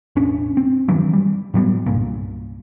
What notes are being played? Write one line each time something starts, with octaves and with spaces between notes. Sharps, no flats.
E1 A1 C#4 D4
C4
G2 D#3 E3 F#3
G3
A2 F#3 G3 B3
C2 G2 A#2